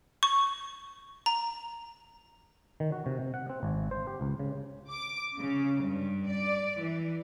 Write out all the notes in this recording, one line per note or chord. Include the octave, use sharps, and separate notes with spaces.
C#6
A#5
D#3
F#4
C3
C3
F#5
C4
G#1
C5
G4
C#2
C#3
D6
C#3
G2
D5
E3